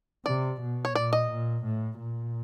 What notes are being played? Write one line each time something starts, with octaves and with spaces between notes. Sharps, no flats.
C3 D5
B2
C#5
A#2 D5
D#5
A#2
A2
A#2